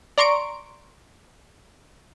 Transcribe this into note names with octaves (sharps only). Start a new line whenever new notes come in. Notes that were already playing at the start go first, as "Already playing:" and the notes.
D5 A#5 C6 C#6 D7